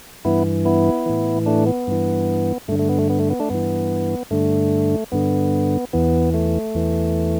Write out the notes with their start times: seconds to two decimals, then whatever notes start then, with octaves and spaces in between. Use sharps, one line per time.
0.25 G2 E3 B3 E4
0.65 B3 E4
1.06 A2 E3
1.46 A3 D4
1.67 B3
1.87 G2 E3
2.68 G2 A3
2.72 D3
2.79 A3
2.89 B3
2.99 A3
3.10 B3
3.20 A3
3.30 B3
3.40 A3 D4
3.50 G2 E3 B3
4.31 G2 D3 A3
5.12 G2 D3 B3
5.93 E2 E3 B3
6.34 A3
6.75 E2 E3